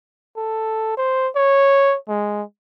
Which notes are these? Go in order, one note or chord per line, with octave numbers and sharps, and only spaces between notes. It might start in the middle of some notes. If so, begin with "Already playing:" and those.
A4
C5
C#5
G#3